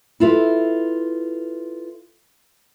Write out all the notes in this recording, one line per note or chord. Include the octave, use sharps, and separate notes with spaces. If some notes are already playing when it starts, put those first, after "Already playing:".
E4 F4 A4 B4